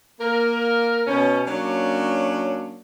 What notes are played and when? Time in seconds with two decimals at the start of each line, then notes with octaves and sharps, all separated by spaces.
0.20 A#3 A#4
1.07 B2 C#4
1.46 F#3 A#3 C#4 D4